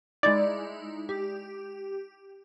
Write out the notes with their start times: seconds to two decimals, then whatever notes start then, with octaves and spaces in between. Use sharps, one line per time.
0.23 G#3 D#4 E4 D5
1.09 G4